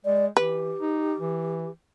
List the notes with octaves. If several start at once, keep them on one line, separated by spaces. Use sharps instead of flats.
G#3 D5
E3 G4 B4
D#4
E3